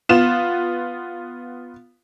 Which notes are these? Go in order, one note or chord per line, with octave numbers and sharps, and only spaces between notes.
B3 F4 E7